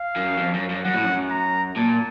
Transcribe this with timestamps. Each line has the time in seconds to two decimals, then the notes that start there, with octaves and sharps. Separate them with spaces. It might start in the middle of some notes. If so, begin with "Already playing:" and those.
Already playing: F5
0.16 F#2
0.38 F2
0.54 F#2
0.69 F#2
0.84 F#2 F#5
0.93 A2
1.03 F#2
1.30 A#5
1.76 A#2 A5